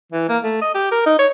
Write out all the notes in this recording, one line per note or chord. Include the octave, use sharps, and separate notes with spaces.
E3
A#3
A3
D#5
G4
A#4
D#4
C#5